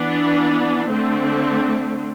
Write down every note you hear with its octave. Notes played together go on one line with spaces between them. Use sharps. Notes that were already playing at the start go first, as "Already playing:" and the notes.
Already playing: E3 B3 D4
D3 A3 C4